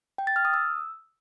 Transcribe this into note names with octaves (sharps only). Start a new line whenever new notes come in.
G5
A6
F6
D#6
E6